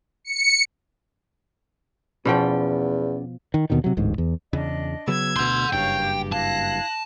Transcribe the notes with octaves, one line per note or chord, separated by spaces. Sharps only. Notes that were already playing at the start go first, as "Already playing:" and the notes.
C#7
E2 B2 F3 C#4 D5 F#5 G5
D#3
D#2 B2 D3 D#3
C3 F#3
D1 A1 G#2
E2
E2 C#3 D4 D#5
C#3 F#3 B3 E6 G#6
D2 B2 F#5 C6 G6
F#1 G2 C#5 F5 G5
G4
E4 F5 A5 F#6 G#6 A#6